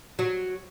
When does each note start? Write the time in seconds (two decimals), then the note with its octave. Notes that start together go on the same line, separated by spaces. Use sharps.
0.19 F#3